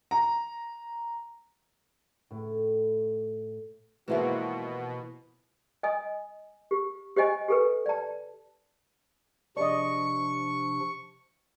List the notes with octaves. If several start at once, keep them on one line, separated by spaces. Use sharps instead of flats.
A#5
A2
G#2 B2 E3 F3 A#3 E4 F#4
D#5 G#5 D#6
G4
G4 C5 D#5 G#5
G4 A4 B4
D5 A5
C3 F3 D4 D5 D#5 C#6